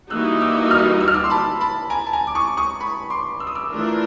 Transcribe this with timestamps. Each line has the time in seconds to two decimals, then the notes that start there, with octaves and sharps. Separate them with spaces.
0.10 E3 G3 A#3 D#4 F#4 E6 F#6
0.41 D6 E6
0.71 D#6 F6
1.01 E6
1.08 F6
1.14 D6 E6
1.24 C6
1.30 A5 B5
1.61 A5 B5
1.90 G#5 A#5
2.06 A5
2.13 G#5 A#5
2.27 D6
2.35 C#6 D#6
2.57 C#6 D#6
2.80 B5 C#6
3.10 C6 D6
3.40 E6
3.47 D#6
3.55 D6 E6
3.70 E3 A3 D4 F4 A#4